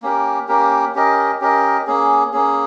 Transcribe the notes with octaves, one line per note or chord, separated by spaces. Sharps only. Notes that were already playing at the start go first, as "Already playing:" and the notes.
A#3 C#4 G4 A#4
A#3 C#4 G4 A#4
C#4 G4 A#4 D#5
C#4 G4 A#4 D#5
A#3 C#4 G#4
A#3 C#4 G#4